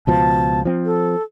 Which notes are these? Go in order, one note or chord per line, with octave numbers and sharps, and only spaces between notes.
C#2 B2 F3 A5
F3 C4
A4